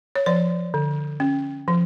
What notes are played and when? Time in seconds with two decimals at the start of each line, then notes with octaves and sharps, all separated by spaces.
0.15 C#5
0.26 F3 D5
0.74 D3
1.20 C#4
1.68 F3